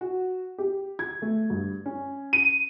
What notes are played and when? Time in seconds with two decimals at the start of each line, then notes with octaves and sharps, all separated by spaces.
0.01 F#4
0.58 G4
0.99 G#6
1.22 A3
1.50 G2
1.86 C#4
2.33 D#7